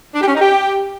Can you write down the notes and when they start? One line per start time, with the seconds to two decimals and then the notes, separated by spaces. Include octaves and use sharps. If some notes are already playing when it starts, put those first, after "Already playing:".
0.15 D4
0.21 G4
0.28 C#4
0.35 D#4
0.41 G4